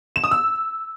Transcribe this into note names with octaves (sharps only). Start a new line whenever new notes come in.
E7
D#6
E6